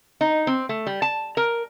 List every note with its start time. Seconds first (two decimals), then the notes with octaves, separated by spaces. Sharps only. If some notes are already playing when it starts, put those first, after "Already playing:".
0.21 D#4
0.47 C4
0.69 A3
0.87 G3
1.02 A5
1.37 A#4